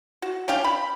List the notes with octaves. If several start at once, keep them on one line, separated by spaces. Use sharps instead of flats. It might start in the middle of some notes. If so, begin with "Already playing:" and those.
F#4
C#4 D4 F5 G5
B5